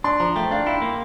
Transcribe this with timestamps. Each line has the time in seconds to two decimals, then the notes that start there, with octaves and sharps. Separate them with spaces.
0.04 D4 C6
0.20 F3 A#5
0.36 A3 G5
0.51 D4 F5
0.66 E4 G5
0.82 A#3